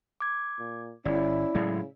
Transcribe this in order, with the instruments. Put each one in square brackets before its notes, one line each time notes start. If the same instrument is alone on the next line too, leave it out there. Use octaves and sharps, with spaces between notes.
[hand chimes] D6 G#6
[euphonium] A#2
[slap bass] G1 [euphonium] C#4 [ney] E4 [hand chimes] D5
[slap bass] A2 F#3 G#3 [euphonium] C#3